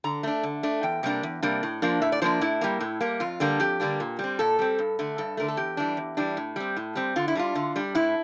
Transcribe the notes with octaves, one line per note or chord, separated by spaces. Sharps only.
D3 A#5
A3 D4
D3
A3 D4
E2 G5
C3 G3 A#3 D4
E2
C3 G3 A#3 D4
A2
F3 A#3 D4
A2 E5
D5
F3 A#3 D4 C5
A2 E4
G3 A#3
A2
G3 A#3
F2 F4
D3 G3 A#3 D4
F2 G4
D3 G3 A#3 D4
A#2
G3 C4
A#2 A4
G3 C4
G2
D3 A3
G2 A4
D3 A3 A#4
A4
E2 G4
E3 G3 D4
E2
E3 G3 D4
A2
G3 C4
A2
G3 C4
D3 F4
E4
G3 D4 F4
D3
G3 D4
A2 E4